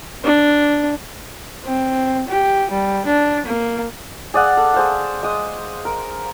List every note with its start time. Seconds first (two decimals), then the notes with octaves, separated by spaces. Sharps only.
0.24 D4
1.66 C4
2.28 G4
2.71 G3
3.06 D4
3.46 A#3
4.34 G#4 D5 F5 F#5
4.57 A4
4.74 G#4 C5 F5
5.23 G#3 D#6
5.85 A#4